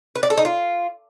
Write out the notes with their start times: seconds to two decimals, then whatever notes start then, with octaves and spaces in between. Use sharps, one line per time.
0.15 B4
0.23 D5
0.30 A4
0.38 D#4
0.45 F4